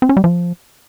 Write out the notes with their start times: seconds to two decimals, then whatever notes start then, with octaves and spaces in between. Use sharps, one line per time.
0.02 C4
0.09 C#4
0.17 G3
0.24 F3